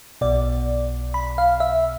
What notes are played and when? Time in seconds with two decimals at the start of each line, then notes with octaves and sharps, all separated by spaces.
0.21 B1 B2 D5
1.14 B5
1.38 F5
1.60 E5